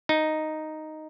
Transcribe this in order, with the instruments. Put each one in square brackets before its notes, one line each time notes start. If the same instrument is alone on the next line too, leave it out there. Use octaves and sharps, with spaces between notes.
[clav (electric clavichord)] D#4